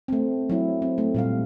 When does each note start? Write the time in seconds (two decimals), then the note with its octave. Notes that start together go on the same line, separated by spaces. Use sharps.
0.08 A3 C4
0.50 F#3 E4
0.82 C4
0.98 A3
1.14 A#2 G3 F5